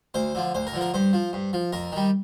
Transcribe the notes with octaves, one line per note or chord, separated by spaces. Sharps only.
D2 C5
D3 F3
D2 C5
A#4
D3 F3
A#4
G2 C5
F3
G2
F3
F2 A#4
D#3 G3